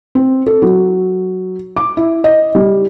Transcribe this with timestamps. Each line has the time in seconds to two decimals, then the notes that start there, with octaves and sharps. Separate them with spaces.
0.15 C4
0.47 A4
0.62 F#3
1.76 D6
1.97 E4
2.24 D#5
2.55 G3